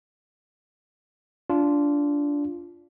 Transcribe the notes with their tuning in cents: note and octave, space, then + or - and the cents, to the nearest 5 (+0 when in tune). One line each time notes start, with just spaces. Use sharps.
D4 -20 F4 -10